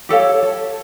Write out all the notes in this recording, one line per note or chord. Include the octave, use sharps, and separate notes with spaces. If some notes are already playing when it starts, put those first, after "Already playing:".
G4 A4 C#5 F5
A4